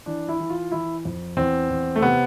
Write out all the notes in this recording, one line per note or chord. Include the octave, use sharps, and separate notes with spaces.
E3 D4
E4
E3
F4
E3 E4
F2
E2 C4
E2
A3
C3 B3